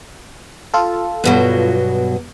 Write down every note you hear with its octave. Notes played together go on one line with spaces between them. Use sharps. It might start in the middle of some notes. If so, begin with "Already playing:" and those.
F4 A4
G2 B2 F#3